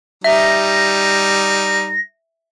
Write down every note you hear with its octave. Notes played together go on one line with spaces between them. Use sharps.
G3 D#4 E5 A#6